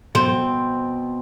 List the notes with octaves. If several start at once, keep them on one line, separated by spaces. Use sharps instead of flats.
B2 C4